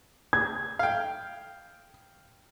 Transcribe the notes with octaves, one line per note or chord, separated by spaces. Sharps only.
G#6
F5 G5